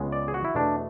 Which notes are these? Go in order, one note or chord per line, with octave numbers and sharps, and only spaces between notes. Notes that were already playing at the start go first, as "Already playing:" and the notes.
Already playing: C#2 C#3 G#3 B3
D5
G#4
F#4
E4
E2 B2 A3 D4